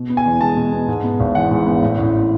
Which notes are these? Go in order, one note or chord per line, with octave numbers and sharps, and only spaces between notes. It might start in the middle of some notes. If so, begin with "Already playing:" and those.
Already playing: B2
B3
G#5
E2
G#3 A5
B2
B3
G#2
B3
G#1
E3 F#5
G#2
B3
A2
A1